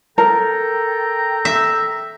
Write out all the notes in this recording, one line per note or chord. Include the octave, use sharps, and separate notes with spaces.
A4 A#4 G5 A#5
E5